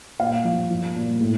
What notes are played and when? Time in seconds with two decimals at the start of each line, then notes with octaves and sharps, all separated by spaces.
0.19 A#2 F5
0.44 F3
0.70 F3
0.96 A#2
1.21 A2